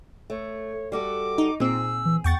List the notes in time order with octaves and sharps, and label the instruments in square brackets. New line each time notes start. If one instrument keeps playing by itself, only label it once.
[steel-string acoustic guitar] A3 [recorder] C#5
[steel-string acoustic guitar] G3 F#4 A4 [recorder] D6
[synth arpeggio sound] D#4
[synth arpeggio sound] A#2 C4 [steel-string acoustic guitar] G#4 [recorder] E6
[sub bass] E3
[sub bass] E2 [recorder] F#5 [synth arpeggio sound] G5 C#6 A6